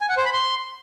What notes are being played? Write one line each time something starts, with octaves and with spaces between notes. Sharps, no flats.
G#5
F#5
C5
B5
C6